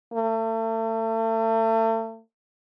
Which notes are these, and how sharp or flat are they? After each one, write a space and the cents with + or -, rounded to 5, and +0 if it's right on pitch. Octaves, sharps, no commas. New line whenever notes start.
A3 +35